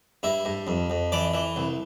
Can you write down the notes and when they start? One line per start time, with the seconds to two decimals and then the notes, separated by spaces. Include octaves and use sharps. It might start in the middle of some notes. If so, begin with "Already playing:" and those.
0.23 G2 E4
0.45 G2
0.67 F2
0.90 F2
1.12 E3 D5
1.34 E3
1.56 C2